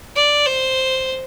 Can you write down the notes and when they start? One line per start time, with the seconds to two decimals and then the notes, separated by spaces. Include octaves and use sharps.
0.16 D5
0.46 C5